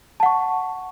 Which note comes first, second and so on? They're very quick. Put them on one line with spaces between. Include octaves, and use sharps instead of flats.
A5 F#5 C#6